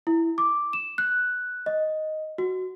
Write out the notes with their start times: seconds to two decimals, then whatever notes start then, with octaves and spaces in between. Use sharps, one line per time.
0.07 E4
0.38 D6
0.73 E7
0.98 F#6
1.66 D#5
2.38 F#4